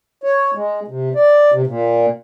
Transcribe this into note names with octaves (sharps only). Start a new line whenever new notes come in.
C#5
G#3
C3
D5
C3
A#2